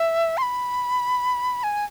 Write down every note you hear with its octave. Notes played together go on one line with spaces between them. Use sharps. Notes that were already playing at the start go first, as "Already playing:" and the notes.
Already playing: E5
C6
B5
G#5